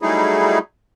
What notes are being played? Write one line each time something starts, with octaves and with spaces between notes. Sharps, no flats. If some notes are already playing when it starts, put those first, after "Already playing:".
F#3 G3 A3 D#4 E4 G#4